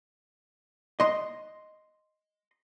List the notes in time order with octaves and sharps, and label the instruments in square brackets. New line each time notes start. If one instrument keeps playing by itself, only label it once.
[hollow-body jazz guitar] D#5 C6